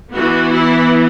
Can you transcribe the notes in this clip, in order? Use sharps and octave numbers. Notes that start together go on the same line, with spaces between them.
E3 B3 F#4
E4